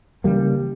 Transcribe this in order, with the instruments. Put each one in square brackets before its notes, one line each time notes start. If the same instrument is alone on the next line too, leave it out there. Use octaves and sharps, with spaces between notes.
[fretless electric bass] C#3 E3 G3 A#3